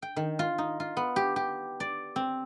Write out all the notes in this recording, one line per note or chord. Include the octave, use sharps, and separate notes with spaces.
G5
D#3
F4
D#4
F4
B3
G4
G4
D5
C4